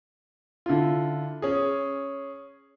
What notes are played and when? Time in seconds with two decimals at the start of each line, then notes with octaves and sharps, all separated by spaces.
0.66 D3 E4 F4
1.42 C#4 G#4